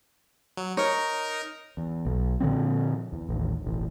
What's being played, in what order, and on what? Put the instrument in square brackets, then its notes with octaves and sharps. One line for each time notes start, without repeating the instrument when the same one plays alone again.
[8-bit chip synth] F#3
[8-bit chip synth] D#4 A#4 [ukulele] C#5
[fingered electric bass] E2
B1
A#2 D3 F3 C4
E2
A1 D#2
E1 A1